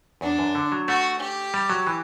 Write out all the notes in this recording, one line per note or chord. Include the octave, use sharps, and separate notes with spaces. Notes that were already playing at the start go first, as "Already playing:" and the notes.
E2 D4
F#2
D3
F#3
A3 F#4
G4
G3
F#3
E3